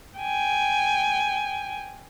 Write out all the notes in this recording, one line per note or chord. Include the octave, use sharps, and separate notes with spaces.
G5 G#5